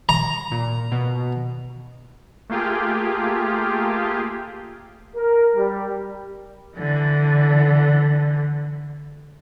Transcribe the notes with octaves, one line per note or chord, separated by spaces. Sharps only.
A#5
A#2
B2
A3 A#3 F4 G4 G#4
A#4
G3
D3 E3